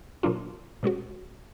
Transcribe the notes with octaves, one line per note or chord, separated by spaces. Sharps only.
B2 F#3 A#3 D4 F4
B2 G#3 C#4 F#4